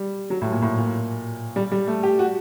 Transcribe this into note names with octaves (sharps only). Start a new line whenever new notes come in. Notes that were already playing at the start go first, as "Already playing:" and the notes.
Already playing: G3
F#3
A2
A#2
A2
A#2
G3
G3
A3
G4
F#4